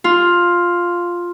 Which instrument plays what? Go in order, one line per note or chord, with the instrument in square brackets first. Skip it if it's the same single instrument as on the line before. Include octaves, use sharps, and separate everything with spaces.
[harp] F4